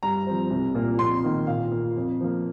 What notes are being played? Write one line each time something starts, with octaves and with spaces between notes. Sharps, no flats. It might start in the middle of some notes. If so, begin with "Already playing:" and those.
G2 A#5
F3 C4
C2
A#2 A#3
F2 C6
D#3 A#3
A#2 F5
A#3
F2
F3 A#3